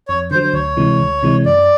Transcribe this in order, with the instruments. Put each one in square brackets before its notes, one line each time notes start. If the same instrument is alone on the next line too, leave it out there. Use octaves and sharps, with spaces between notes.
[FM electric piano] F2 [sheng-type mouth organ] C#5
[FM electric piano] D3 [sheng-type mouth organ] C5
[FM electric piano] F#3
[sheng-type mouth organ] C5
[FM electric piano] D2 [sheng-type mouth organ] C#5
[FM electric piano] C3 E3 G#3
D2
C3 E3 G#3
[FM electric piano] F#2 [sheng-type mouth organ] D5